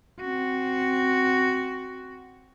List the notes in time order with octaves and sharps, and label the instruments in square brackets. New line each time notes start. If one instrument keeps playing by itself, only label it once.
[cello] C4 F#4